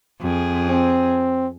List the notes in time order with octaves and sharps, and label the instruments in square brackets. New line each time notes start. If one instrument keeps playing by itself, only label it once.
[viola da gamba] F2 G#4
[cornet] C4